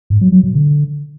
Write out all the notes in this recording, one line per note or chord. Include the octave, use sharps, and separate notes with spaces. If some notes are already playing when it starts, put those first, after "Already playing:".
G#2
F#3
F#3
B2
D3